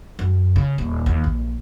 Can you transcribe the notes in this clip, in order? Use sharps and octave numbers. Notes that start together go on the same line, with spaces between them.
F#2
C#3
D#1
D#2
A#1